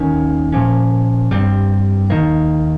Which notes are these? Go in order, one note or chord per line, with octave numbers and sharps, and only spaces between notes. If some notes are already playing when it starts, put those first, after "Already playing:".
Already playing: D#2 D#3 A#3 C#4
A#2 F3 A#3 C#4
G2 G3 C4
D#2 D#3 A#3